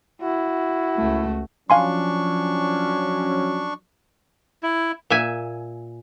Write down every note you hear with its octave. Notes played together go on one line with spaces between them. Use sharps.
E4 F#4
C#2 A3
F3 F#3 C#4 D4 F5 G#5 C6 C#6
E4
A#2 E5 G#5